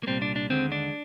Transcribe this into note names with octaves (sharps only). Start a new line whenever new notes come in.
A#3
C2 A#2 G3 C4
D4
D4
D#2 D3 G#3 C4
D4